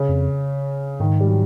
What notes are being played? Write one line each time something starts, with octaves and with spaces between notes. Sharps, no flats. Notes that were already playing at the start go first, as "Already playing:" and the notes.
Already playing: C#3
F2
G#2 D#3
G3
F#3